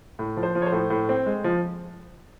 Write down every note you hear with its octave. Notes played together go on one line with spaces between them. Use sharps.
A2
F3
C5
F3
C#5
C5
A2
A2
C4
G#3
F3